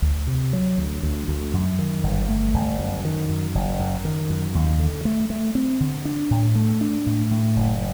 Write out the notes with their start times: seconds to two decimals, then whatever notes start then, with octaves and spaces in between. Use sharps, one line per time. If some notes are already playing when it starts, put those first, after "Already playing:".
0.02 D2
0.27 C3
0.53 F#3
0.78 D2
1.03 D2
1.28 D2
1.54 F#2
1.79 D#3
2.03 G1
2.29 A3
2.54 G1
2.79 F#2
3.05 D#3
3.29 F#2
3.55 F#1
3.79 F#2
4.05 D#3
4.30 F#2
4.55 D#2
4.80 D3
5.05 A3
5.30 A3
5.55 C4
5.80 D3
6.05 D4
6.30 A2
6.55 A3
6.81 D4
7.06 A2
7.31 A2
7.56 F#1